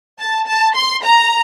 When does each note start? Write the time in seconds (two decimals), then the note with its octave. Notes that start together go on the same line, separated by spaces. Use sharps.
0.19 A5
0.47 A5
0.75 C6
1.03 A#5